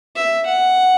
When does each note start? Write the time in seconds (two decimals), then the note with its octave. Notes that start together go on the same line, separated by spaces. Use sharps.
0.16 E5
0.47 F#5